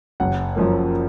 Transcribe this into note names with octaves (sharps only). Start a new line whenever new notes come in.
F#1 F#5
F#2 F3 A#3